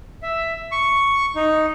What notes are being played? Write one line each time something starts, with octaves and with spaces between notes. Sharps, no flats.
E5
C#6
D#4